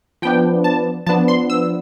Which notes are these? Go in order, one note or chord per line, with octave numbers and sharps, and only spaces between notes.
F3 B3 D4 G5
A5
F3 B3 D4 A5
C6
E6